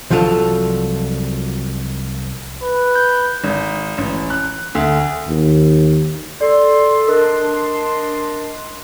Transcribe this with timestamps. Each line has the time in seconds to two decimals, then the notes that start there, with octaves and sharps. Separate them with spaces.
0.10 C2 F3 F#3 F4 A4
2.63 B4
2.95 G6
3.44 G#1
3.98 A1
4.30 F#6
4.75 D2
5.28 D#2
6.41 A4 D5 C6
7.08 D4 A#4 D#5 C6